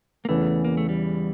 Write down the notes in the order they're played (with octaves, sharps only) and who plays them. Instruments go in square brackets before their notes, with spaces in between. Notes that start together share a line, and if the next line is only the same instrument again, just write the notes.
[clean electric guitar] A#3
[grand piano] E2 C#3 E3 [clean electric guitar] A3
[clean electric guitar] A#3
A3
G3